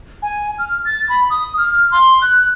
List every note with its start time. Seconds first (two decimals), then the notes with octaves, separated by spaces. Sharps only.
0.22 G#5
0.59 F6
0.85 A6
1.09 B5
1.30 D#6
1.58 F6
1.91 C6
2.22 F#6